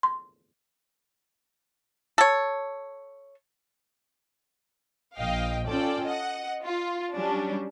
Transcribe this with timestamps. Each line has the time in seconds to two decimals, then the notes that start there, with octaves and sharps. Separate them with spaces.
0.03 C6
2.18 A4 C#5
5.17 A#1 D#5 F5 G5
5.67 C#4 F4 A4 D5 G5
6.05 D#5 F#5
6.64 F4
7.14 F#3 G3 C#4 D4